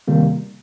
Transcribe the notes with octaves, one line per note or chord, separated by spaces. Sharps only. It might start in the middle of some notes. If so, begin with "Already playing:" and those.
C3 D#3 G3 A#3